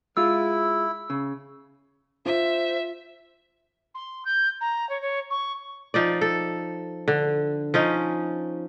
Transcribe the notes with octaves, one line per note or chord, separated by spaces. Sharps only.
G#3 E4 F4 E6
C#3
F4 C5 E5
C6
G6
A#5
C#5
C#5
C#6
F3 D#4 D5
A4
D3
F3 C#4 D#4